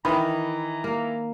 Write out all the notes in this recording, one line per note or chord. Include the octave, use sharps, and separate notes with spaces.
D#3 E3 D#5 A#5 B5
A#3